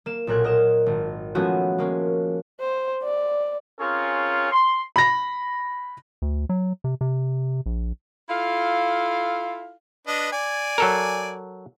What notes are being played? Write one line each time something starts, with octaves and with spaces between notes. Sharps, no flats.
A#3 E7
B1 A#2 A#4 F#6 G#6
A#4 D#5 E7
G#1
F3 G#3 A3 B3 C#4 F#4
G#3 A#3 C#4
C5
D5
C4 C#4 F4 G#4 A#4 C#5
C6
B5 A#6
D2
F#3
C3
C3
A#1
E4 F4 A4 F5
D4 B4 D#5
D5 G#5
F#3 A4 A#4